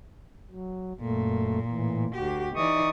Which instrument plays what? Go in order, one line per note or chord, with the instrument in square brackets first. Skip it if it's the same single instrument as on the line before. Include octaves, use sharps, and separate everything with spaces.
[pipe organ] F#3
[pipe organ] F#2 A3 [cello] A#2
[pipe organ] A2 E3
[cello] D2 G4 [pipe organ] F#4
[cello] E3 D5 [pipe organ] D#4 C#6 D#6